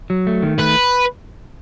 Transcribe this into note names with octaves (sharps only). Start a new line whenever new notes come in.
F#3
A3
D#3
A3 B4